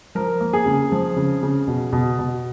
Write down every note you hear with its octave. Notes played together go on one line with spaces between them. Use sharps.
F3 A#4
A#3
G#4
C#3
F3
C#3
C#3
B2
B2
B2